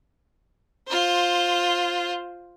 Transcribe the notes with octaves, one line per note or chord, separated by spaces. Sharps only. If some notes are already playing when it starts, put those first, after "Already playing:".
F4 C5